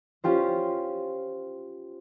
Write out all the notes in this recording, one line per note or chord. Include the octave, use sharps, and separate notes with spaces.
C#4 F4 G4 C5